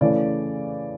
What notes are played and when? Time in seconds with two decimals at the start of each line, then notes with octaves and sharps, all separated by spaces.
0.01 C#3 E3 A3 D5